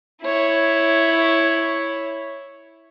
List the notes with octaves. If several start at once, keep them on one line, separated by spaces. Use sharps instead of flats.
E4 C#5